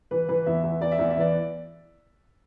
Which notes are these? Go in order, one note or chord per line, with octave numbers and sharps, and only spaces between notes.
E3 B4
E3 B4
E2 E5
E2 E5
E2 D5
E5
E2 D5
E5
E3 D5